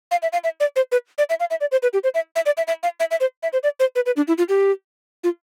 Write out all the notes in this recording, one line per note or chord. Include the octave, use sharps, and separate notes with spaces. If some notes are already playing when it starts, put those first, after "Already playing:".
F5
E5
F5
E5
D5
C5
B4
D5
E5
F5
E5
D5
C5
B4
G4
C5
E5
E5
D5
E5
E5
F5
E5
E5
C5
E5
C5
D5
C5
B4
B4
D4
E4
F4
G4
F4